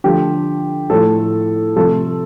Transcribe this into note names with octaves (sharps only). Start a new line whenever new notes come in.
D3 F3 A3 G4
A2 F3 A3 A4
C3 F3 A3 A4